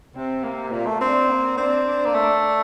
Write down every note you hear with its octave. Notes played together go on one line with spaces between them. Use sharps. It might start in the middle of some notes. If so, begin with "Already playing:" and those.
C3 C4
A#3
A#2 A#3
A3
C4 D4
A#3
C4 D4
D4
A#3
A3